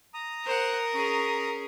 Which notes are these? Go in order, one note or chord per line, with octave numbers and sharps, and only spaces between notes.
A#5 D#6
A#4 C5 F#5
C#4 G#4